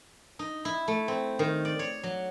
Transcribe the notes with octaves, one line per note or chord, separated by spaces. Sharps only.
D#4
E4
A3
C4
D#3
D5
C#5
F#3